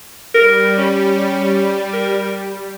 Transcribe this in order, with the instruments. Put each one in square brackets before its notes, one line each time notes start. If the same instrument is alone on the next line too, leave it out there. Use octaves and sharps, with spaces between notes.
[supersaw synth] G3 [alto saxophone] A#4
[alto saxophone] C#4
A#4